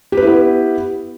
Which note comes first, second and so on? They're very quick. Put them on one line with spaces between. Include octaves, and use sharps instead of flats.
G4 B4 E4 B3